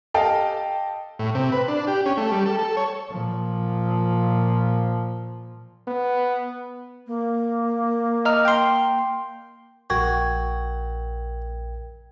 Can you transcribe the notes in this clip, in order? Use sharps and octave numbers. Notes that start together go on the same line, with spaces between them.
G4 A4 D#5 F5 G5 A5
A2
C3
B4
D4
G4
C#4
A3
G3
A4
A4
C#5
A#2 F3
B3
A#3
D#5 A#5 F6
G5 C6
A#1 F#4 A#4 G5 G#6